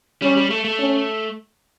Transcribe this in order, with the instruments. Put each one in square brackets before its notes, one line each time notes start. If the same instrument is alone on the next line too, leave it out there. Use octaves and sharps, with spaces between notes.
[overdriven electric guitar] G3 [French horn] C#4
[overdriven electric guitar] G3
A3
A3
[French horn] C#4